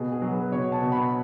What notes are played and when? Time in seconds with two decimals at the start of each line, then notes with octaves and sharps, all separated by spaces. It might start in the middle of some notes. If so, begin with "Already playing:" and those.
Already playing: B2 G#4
0.12 G#4
0.22 F#3
0.32 B4
0.52 B2 C#5
0.72 A5
0.82 B2
0.92 B5